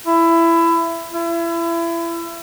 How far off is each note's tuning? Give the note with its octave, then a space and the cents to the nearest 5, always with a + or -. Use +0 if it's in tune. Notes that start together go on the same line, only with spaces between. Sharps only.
E4 +20
E4 +30